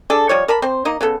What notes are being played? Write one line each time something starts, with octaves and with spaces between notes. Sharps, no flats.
D4 G#4 A4
F3 G3 C#5
A#4 A5 B5
C4 C5
A#3 D#4 D#5
C#3 B3 A4